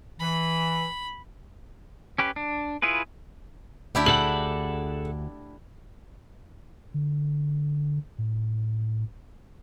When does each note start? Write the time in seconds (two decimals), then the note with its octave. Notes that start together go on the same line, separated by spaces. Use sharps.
0.20 E3 B5
2.18 C#4 G4 B4
2.36 D4
2.82 E4 F4 G#4 B4
3.95 D2 D4 E4 G4
4.06 G#4 A4 F#5 F#7
6.94 D3
8.18 A2